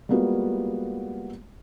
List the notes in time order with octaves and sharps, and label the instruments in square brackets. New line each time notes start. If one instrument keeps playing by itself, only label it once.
[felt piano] G3 G#3 A#3 B3 F4 F#4